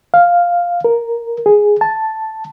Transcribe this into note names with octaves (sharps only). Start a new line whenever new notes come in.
F5
A#4
G#4
A5